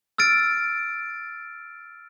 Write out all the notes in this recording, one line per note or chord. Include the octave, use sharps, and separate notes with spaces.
E6 F6 A6 D7